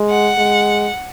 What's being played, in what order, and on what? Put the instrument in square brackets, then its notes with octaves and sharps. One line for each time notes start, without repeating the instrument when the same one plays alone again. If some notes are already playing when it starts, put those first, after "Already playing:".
Already playing: [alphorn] G#3
[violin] F#5
[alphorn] G#3